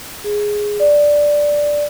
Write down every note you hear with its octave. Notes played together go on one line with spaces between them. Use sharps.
G#4
D5